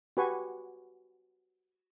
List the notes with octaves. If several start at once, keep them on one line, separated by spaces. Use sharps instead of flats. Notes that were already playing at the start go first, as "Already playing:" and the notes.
F#4 G4 B4 F#5 G#5 C#6